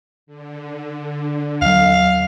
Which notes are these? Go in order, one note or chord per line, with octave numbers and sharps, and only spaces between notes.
D3
D#2 F#3 F5